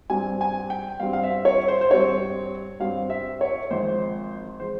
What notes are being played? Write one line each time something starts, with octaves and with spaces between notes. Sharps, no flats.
G2 G3 C4 G#5
G#5
G5
G2 G3 C4 F5
F5
E5
C#5
C5
C5
G2 G3 C4 C#5
G2 G3 C4 F5
E5
C#5
G#1 G#2 F3 G#3 C5
F3 G#3 C5